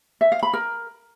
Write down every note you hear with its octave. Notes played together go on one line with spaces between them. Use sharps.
E5
F5
B5
A#4